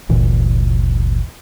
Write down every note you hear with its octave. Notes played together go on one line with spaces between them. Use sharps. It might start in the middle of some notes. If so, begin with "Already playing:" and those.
G1 D2 A#2 E3